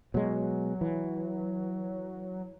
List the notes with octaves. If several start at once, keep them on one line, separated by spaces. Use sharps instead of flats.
B2 F#3 G#3
E3